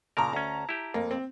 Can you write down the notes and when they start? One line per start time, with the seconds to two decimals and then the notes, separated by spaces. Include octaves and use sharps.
0.17 A#2 C#3 A#4 A5 A#5
0.33 D2 C#4
0.69 E4 G4
0.94 F2 A#3
1.11 C4